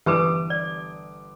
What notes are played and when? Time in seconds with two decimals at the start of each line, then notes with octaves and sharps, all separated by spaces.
0.06 G1 E3 G4 B4 D6 D#6
0.50 D5